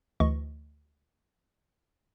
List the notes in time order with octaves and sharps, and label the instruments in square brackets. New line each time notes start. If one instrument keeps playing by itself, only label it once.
[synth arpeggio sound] D2 E3 D#5 C#6